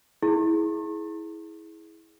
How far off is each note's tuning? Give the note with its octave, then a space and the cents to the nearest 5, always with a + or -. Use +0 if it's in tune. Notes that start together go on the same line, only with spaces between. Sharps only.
E4 -15 G#4 +15 C#6 -45